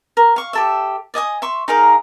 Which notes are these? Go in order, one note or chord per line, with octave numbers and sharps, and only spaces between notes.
A#4
F5 C#6
G4 A4 E5
D5 D#5 G#5 D#6
E5 C6 C#6
D#4 G#4 A#4 F5